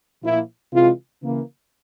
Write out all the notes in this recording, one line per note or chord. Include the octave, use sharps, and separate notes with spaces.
A#2 F3 A#3 E4
C3 E3 G#3 F4
C#3 E3 A#3